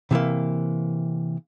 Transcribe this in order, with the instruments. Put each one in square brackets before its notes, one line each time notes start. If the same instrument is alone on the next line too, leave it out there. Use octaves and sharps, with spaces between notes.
[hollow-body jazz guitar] C3 E3 A#3